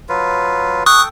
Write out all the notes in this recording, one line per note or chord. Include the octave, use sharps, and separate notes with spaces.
F#3 F4 B4
A4 G5 C#6 D#6 F#6